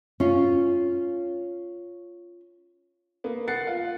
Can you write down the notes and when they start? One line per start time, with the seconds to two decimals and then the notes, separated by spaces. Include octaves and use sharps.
0.20 C#4 F4
3.24 A#3 B3
3.48 F#5 F#6 A6 C7 C#7
3.67 F4